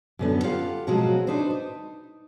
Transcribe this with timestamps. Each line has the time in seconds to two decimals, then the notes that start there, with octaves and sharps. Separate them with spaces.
0.19 F#2 D3 B3
0.43 F4 G4 F5 F#5
0.87 B2 F3 F#3 G#3 C4 F#4
1.27 D4 D#4 B4 C5
1.50 D#4